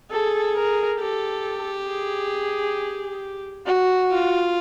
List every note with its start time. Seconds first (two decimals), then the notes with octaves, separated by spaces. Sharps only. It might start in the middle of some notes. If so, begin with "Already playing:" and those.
0.11 G#4 A4
0.56 A#4
0.99 G4 A4
1.88 G#4
3.67 F#4
4.12 F4